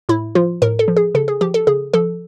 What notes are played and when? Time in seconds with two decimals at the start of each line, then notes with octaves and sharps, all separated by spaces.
0.09 A2 E4
0.35 F3 F4
0.62 A2 A#4
0.79 A4
0.88 F3
0.97 G#4
1.15 C#3 A4
1.28 G#4
1.41 F3 G4
1.54 A4
1.67 C#3 G#4
1.93 F3 A4